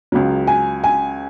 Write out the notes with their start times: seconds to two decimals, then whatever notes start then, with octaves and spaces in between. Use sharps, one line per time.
0.12 C#2 C#3 F#3
0.47 G#5
0.84 G#5